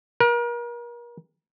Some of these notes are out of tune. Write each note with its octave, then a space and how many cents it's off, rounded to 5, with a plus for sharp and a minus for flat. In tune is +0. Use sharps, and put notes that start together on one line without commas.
A#4 +35